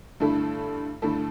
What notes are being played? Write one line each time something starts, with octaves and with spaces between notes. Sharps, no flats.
G2 D3 A3 E4 A4
G2 D3 A3 E4 A4